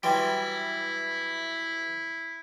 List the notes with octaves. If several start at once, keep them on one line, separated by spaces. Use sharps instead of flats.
E3 F#3 G3 E4 G5 C6